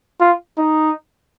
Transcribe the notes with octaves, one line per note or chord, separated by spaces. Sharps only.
F4
D#4